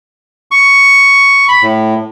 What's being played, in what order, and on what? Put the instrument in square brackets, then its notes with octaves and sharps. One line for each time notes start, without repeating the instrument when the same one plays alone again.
[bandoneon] C#6
B5
A2